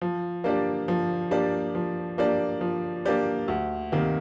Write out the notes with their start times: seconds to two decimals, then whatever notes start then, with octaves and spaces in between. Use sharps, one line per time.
0.01 F3
0.44 A#3 D4 G4 D5
0.88 F3
1.31 A#3 D4 G4 D5
1.75 F3
2.18 A#3 D4 G4 D5
2.61 F3
3.05 A#3 D4 G4 D5
3.48 D2
3.92 C3 D#3 A#3